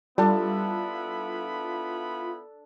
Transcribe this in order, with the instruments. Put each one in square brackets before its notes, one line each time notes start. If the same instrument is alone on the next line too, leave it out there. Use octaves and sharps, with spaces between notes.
[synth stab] G3 [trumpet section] B3 E4 B5 [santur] D4 A4 [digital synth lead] F4